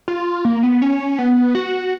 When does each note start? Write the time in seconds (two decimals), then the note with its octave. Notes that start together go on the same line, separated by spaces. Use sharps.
0.08 F4
0.45 A#3
0.63 B3
0.82 C#4
1.19 B3
1.55 F#4